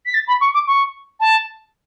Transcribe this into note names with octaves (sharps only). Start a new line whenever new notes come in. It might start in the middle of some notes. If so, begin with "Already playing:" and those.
B6
A6
B5
C#6
D6
C#6
A5